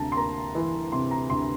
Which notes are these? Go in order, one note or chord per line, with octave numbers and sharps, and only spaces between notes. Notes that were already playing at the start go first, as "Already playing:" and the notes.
Already playing: D2 C3 A5 A#5
C6
A#3 A#5
E3
C3 C6
A#5
D2 C6